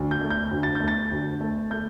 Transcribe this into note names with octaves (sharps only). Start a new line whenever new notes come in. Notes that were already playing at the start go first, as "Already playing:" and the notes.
Already playing: D2
G6
A3
G6
D2
A6
G6
A3
A6
D2
A3
A3 G6